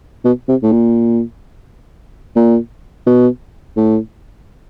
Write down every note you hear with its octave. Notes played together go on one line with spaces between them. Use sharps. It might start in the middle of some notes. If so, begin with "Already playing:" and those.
B2
C3
A2
A#2
A#2
B2
A2